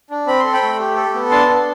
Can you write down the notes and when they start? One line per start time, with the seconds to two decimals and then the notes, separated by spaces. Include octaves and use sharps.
0.10 D4
0.27 C4 B5
0.40 A4 C6
0.53 G5 B5
0.62 A3
0.79 G4
0.96 A4
1.14 B3
1.31 D4 A5 C6
1.48 D4